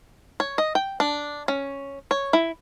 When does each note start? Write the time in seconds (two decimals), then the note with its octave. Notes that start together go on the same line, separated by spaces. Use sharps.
0.40 C#5
0.58 D#5
0.75 G5
1.00 D4
1.48 C#4
2.11 C#5
2.33 E4